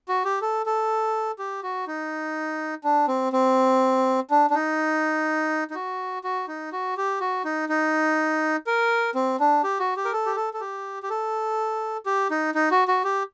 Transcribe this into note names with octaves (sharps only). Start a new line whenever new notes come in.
F#4
G4
A4
A4
G4
F#4
D#4
D4
C4
C4
D4
D4
D#4
D#4
F#4
F#4
D#4
F#4
G4
F#4
D#4
D#4
A#4
C4
D4
G4
F#4
G4
A#4
A4
G4
A4
A4
G4
G4
A4
G4
D#4
D#4
F#4
F#4
G4